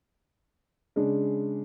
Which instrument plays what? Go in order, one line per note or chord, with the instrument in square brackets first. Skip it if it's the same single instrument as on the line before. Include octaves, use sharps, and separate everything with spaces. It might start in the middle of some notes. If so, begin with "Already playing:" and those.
[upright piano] C#3 G#3 D4